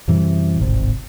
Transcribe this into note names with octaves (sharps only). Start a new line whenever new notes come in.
F#2 C3 E3 G3
D1 G#1 C3